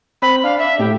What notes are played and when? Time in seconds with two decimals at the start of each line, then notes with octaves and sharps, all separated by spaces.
0.22 C4 B5
0.44 D4 F5
0.59 E5
0.79 A2 G4